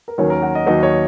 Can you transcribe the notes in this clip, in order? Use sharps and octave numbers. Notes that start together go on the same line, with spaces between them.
A#4
D#2 D#3 F#3 C#4 C#5
A#4
F#4
D#5
D#2 D#3 F#3 D#5
C#5